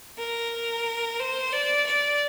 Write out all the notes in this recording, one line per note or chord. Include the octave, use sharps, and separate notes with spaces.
A#4
C5
D5
D5